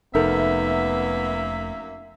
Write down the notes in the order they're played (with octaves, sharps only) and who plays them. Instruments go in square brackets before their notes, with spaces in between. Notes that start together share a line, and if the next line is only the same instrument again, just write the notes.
[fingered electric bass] F1 [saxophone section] F#2 A#3 E5 [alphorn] B3 [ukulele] D#4 A4 A#4